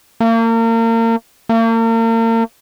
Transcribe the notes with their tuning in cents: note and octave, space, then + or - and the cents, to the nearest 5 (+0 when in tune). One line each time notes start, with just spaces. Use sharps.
A#3 -35
A#3 -40